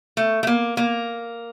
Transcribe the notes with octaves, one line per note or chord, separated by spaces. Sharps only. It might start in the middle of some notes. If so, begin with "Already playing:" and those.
A3
A3
A#3
A#3